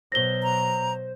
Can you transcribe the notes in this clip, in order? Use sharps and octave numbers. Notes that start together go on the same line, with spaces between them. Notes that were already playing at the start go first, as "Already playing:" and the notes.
B2 F#3 C5 A#6 G7
A#5